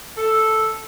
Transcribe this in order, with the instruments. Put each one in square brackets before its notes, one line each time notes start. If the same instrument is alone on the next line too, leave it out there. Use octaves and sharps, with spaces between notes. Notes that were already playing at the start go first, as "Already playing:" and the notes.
[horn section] A4